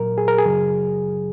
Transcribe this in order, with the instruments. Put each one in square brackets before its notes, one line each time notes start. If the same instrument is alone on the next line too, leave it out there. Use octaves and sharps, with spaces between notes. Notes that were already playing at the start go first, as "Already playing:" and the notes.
Already playing: [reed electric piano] A#2 F#3 A#4
G#4
A#4
G#4
F#2 C#3 F#3